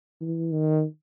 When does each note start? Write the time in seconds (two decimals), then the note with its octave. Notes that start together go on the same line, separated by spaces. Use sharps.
0.21 E3
0.52 D#3